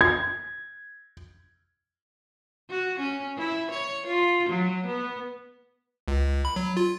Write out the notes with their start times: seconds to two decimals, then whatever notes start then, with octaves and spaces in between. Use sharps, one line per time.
0.01 G#6
2.70 F#4
3.00 C#4
3.37 E4
3.71 C#5
4.06 F4
4.49 F#3
4.86 B3
6.08 C#2
6.45 B5
6.56 F#3
6.77 F4